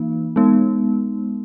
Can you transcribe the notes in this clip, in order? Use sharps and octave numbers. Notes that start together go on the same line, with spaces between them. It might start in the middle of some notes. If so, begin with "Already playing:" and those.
Already playing: E3 A#3 D#4
G#3 B3 D#4